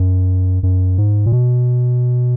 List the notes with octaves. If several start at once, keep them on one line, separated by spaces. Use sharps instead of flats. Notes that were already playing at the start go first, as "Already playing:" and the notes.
Already playing: F#2
F#2
G#2
A#2
B2